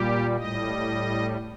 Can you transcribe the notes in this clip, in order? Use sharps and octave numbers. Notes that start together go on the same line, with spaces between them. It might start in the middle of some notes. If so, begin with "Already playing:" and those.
Already playing: A#2 G3 G4
A2 G3 D#5